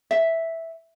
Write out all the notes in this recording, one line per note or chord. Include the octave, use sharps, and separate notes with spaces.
E5